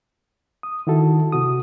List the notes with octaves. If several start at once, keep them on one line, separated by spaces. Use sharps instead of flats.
D#6
D#3 E4 F#4 A4
C3 F#4 D#6